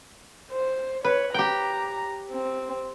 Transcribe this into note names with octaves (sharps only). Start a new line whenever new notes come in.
C5
B4 C#5
G4 G5 A#5
C4